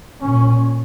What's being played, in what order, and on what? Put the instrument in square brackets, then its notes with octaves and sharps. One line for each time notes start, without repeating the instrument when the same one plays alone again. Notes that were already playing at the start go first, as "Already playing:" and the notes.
[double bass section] A#2 C#4